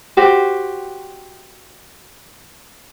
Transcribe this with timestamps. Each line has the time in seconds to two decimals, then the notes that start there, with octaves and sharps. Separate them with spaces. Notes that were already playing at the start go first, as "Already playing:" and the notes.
0.17 F#4 G4 C5